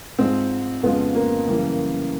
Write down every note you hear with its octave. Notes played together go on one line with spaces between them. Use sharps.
G#2 F3 G#3 C4
F2 C#3 F3 G#3 B3
A#3
F#2 C#3 E3 G3